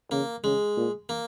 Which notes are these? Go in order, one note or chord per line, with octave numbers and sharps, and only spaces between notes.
C#3 A#3
C#3 G#3
A#2
A#3